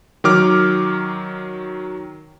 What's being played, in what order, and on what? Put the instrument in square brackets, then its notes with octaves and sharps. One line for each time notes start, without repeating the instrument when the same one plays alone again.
[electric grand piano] D#3 F#3 D6 F6